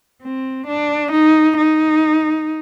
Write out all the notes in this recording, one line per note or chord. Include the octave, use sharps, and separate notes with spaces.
C4
D4
D#4
D#4